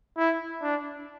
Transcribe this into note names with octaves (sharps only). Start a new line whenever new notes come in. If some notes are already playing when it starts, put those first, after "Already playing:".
E4
D4